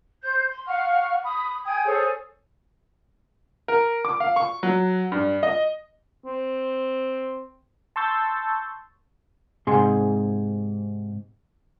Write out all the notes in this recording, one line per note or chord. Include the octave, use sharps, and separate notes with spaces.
C5 G6
C6
F5 F#5 C#6 F6
B5 D#6
G5 G#5 D#6 G#6
G#4 A4 C5 C#5
A#4
D6
F5
C#6
F#3
G2
D#5
C4
A5 C6 C#6 E6 G6 A6
G#2 C3 G#4 C6